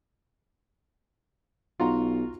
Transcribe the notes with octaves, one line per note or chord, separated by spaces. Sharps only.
B1 F4 F#4 A#5